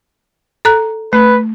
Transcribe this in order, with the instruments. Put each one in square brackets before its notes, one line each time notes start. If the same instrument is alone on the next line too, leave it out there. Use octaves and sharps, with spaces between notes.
[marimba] A4 A#5 F#6
[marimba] A3 [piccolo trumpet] B4